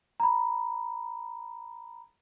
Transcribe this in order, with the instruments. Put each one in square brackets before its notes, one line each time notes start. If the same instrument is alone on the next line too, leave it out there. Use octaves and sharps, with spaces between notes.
[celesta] A#5 B5